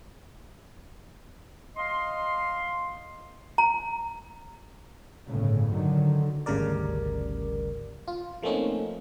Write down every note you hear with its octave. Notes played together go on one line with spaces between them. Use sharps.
D#5 F5 C6
A#5
G1 A2 C#3
D3 D#3 F#3
G#1 D2 C#3 G3 A#4 D5
F4
F3 A3 A#3 C4 C#4 D#4